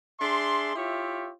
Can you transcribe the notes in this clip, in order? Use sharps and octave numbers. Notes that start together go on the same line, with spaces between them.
D4 G#4 E5 C6
E4 F4 G4 C#5 E5